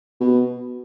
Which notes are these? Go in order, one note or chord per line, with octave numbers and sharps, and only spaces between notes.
B2